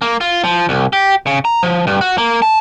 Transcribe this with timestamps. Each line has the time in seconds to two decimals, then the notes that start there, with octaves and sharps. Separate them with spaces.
0.02 A#3
0.21 F4
0.44 F3
0.69 C2
0.93 G4
1.27 C#3
1.45 A#5
1.63 F3
1.87 G2
2.01 F#4
2.18 A#3
2.42 A5